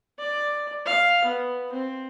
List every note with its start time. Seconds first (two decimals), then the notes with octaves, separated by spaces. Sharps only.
0.19 D5
0.86 F5
1.24 B3
1.72 C4